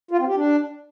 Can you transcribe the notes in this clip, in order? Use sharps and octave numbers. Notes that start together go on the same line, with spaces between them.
F4
C4
G4
D4